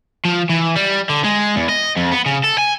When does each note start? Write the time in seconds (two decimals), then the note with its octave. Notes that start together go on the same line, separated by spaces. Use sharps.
0.25 F3
0.50 E3
0.76 G3
1.09 D3
1.24 G#3
1.56 E2
1.69 D#5
1.96 F2
2.12 B3
2.26 C#3
2.44 A4
2.58 G#5